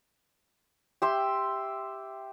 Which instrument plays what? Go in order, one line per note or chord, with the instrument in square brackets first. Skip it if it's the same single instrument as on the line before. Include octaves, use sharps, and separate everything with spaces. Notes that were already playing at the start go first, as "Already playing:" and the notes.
[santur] G4 E5 C6